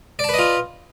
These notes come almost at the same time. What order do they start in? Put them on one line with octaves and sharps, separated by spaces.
D5 A5 B4 D#5 F4